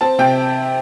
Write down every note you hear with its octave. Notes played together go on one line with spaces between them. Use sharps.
C4 A5
C3 G5